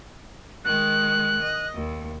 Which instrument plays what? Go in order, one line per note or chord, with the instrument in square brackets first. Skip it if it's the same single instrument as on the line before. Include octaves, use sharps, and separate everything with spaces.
[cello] D#3 G#3 [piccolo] F#6
[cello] D#5
D#2